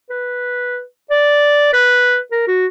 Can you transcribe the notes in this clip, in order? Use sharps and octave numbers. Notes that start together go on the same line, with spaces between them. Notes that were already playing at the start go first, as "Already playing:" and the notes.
B4
D5
B4
A#4
F#4